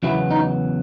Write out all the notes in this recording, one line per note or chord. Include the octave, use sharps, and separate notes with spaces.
E2 C#3 F#3 B3 E4
D#4